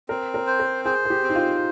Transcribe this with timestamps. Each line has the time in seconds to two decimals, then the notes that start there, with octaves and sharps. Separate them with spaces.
0.09 C4 A#4
0.34 A#4
0.47 C5
0.60 A#4
0.85 G#4 C5
1.05 G#4
1.10 G4
1.23 C4
1.29 D#4
1.35 F4